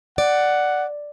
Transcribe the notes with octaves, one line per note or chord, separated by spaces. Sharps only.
D5 F#5